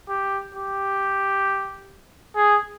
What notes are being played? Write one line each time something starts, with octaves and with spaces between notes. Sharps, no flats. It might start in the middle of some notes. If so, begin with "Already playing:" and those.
G4
G4
G#4